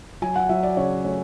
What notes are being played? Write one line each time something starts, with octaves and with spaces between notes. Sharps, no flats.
F#3 G#5
F#5
F#3 E5
D5
C#3 C#5
A3 C#5